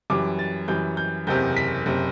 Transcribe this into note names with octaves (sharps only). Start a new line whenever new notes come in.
F#2 E3 G3 D6
A6
F#2 E3 G3 G6
G6
F#1 E2 C3 G6
B6
F#1 C3